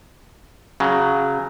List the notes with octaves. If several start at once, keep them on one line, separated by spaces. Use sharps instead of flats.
C#3 F#3